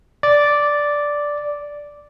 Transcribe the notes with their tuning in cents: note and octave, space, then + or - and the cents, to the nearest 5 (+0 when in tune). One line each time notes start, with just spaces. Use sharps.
D5 -5